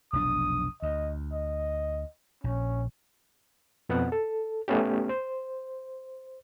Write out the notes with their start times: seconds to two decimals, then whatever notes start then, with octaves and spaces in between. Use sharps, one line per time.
0.13 F1 B1 D4 D#6
0.82 D2 D#5
1.33 D#5
2.44 A#1 C#4
3.89 F2 B2 B3 C4 F#5
4.12 A4
4.68 A3 B3 C#4 G4
5.09 C5